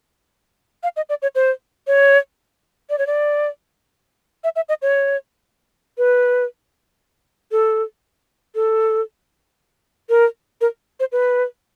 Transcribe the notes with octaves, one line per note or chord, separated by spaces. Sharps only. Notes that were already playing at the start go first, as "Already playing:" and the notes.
F5
D#5
D5
C#5
C5
C#5
D5
C#5
D5
E5
E5
D#5
C#5
B4
A4
A4
A#4
A#4
C5
B4